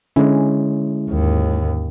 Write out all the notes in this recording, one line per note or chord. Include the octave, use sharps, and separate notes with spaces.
D3 G#3 C#4 E4
D#2 G#2